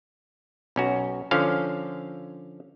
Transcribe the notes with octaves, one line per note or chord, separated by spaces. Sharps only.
B1 C#4 F#4
D3 F3 C#4 F5